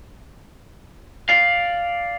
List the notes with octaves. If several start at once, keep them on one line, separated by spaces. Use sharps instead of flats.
D5 F5